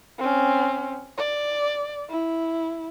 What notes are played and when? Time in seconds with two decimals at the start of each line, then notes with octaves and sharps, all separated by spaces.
0.19 C4 C#4
1.17 D5
2.10 E4